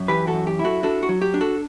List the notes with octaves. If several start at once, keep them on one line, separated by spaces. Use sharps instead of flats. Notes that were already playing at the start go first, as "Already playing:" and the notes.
Already playing: F#2
E3 G4 B4
F#4 A4
F#2
G4
E4
F#4 A4
D4 F#4 A4
F#4
F#3
G4
D4
F#4 A4